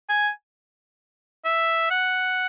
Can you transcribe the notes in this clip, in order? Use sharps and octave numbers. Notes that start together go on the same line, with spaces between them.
G#5
E5
F#5